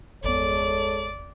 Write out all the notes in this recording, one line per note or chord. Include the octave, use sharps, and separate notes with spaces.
G1 E2 G#3 B3 A4 C#5 D5